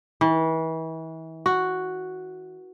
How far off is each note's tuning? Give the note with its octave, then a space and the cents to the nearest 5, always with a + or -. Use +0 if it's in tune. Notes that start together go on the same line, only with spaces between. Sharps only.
E3 -35
F#4 +0